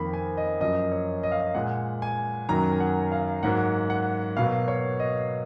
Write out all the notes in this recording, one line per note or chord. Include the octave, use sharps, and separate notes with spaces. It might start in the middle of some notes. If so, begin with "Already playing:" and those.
Already playing: F2 D#3 A#3 B5
G#5
D#5
F#2 F3 A#3 D#5
C#5
D#5
F5
D#5
A#2 G#3 F#5
G#5
F#2 D#3 F#3 A#3 A#5
G#5
F#5
F5
G#2 F#3 A#3 F#5
F#5
B2 F#3 A#3 F5
C#5
D#5